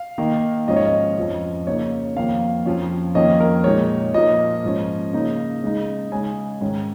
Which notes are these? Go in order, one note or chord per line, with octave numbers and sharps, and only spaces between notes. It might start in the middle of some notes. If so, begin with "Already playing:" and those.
Already playing: F5
D#3 A#3 D#4
G#2 F3 C#4 D#5
C#5
D#5
F2 F3 C#4
C#3 A#3 D#4 C#5
F2 D#3 A#3 F5
F2 F3 C#4
F2 D#3 A#3 C#4 D#5
A#4
A#2 G#3 D#4 C#5
A#2 F3 A#3 D#5
G#2 F3 C#4
C#3 A#3 D#4
C#3 G#3 D#4
C#3 G#3 C#4 G#5
G#2 D#3 C#4